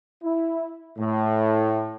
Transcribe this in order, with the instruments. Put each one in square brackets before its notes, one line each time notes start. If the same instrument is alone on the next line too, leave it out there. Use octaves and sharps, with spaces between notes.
[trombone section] E4
A2